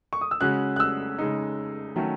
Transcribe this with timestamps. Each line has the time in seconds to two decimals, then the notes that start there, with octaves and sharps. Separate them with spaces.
0.13 C#6
0.21 D#6
0.31 E6
0.41 C#3 G#3 C#4 F#4 F#6
0.76 F#6
0.80 E6
1.19 C#3 G#3 D#4
1.96 D#3 F#3 A3 C#4